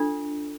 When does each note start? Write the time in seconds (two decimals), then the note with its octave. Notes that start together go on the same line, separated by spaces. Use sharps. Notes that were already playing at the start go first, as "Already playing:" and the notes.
Already playing: D4 F4 A4